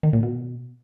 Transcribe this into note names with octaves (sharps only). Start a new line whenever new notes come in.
D#3
A#2
B2